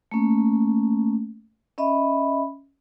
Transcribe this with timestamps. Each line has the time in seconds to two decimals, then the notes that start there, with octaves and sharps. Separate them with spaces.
0.11 A3 A#3 C#4
1.78 C#4 D#5 E5 B5